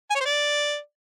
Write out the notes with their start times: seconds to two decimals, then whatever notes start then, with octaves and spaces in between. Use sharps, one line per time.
0.10 G#5
0.15 C#5
0.20 C5
0.26 D5